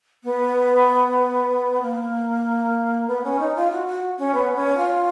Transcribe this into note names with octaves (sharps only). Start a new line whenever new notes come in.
B3
A#3
B3
C#4
D#4
F4
F#4
F#4
C#4
B3
C#4
F4